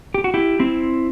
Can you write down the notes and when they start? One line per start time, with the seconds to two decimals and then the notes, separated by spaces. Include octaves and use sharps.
0.14 G4
0.24 F#4
0.34 E4 G4
0.59 C4 E4